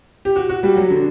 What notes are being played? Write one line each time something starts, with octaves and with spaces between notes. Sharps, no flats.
G4
F#4
F#4
G3
F#3
D3